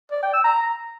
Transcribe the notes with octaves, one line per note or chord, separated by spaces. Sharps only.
D5
G5
E6
A#5